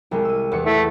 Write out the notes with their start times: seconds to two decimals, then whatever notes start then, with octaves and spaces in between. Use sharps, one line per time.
0.11 C2 G3 G#3
0.25 E6 D#7
0.52 E2 E3 C#7
0.66 A3 E4